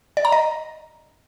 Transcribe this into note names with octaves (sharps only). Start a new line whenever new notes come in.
D5
A#5
D#5